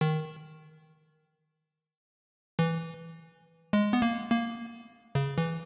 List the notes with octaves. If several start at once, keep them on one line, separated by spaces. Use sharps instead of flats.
D#3
E3
G#3
B3
A#3
A#3
C#3
E3